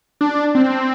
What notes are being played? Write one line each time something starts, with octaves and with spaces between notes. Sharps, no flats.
D4
C4